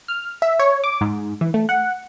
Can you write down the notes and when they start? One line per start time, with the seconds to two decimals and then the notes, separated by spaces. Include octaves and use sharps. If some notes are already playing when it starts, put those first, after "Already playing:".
0.08 F6
0.42 E5
0.59 C#5
0.84 D6
1.01 G#2
1.41 E3
1.54 A3
1.69 F#5